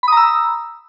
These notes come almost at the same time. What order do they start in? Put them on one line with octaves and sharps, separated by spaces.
B5 D#6 A#5 E6